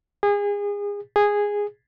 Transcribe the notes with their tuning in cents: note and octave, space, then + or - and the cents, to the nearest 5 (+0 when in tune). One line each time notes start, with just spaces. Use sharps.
G#4 -30
G#4 -10